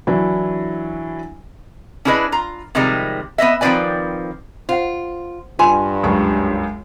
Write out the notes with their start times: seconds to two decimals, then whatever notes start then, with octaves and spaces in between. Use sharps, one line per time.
0.07 E3 F#3 D4 E4
2.05 C#4 D4 E4 G#4 B4 D#5
2.32 F4 A#5
2.75 C3 D#3 F3 G3 G#3
3.38 B3 B4 D#5 E5
3.61 D#3 F3 C4 B4 D5 G#5
4.69 F4 C5 F#5
5.59 G2 F4 B4 G#5 C6
6.03 C#2 F#2 C#6